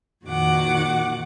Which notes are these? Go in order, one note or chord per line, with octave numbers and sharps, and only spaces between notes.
F2 A#2 D#3 F#4 F#5 D6